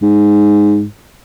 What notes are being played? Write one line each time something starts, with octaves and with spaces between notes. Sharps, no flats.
G#2